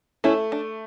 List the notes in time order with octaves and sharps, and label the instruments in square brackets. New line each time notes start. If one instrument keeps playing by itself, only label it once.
[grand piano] A3 [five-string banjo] C#4 E4
[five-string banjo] D4